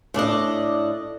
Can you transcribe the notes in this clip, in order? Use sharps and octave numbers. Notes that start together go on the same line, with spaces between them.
A2 D4 D5 D#5